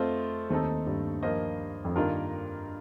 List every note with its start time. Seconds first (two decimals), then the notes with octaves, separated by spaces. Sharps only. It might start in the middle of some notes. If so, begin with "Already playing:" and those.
Already playing: F2 A3 C4 F4 C5 D#5
0.50 D#2 D#3 A3 C4 D#4 A4
0.86 G2
1.23 F3 A#3 F4 C5 D#5
1.85 F2
1.95 G2 D#3 A#3 D4 F4 A#4